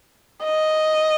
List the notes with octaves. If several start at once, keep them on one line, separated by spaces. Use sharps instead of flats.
D#5